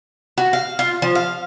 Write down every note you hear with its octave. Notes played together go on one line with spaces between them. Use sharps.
F#4
F5
F4
F3
F5